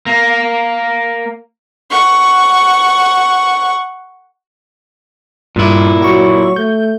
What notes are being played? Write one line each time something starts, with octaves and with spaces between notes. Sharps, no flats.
A#3
F#5 C#6
G2 A#2 E4
F#3 F#4 C#6
A3 G6